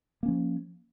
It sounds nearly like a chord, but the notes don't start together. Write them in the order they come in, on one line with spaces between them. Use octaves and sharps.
A#3 C#4 F3